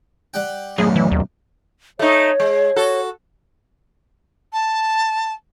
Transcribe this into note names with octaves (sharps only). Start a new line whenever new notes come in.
G3 F#5 G5
B1 F#2 A2 G#4
E3
D#2
A3 D#4 C#5
G#3
F#4 A4
A5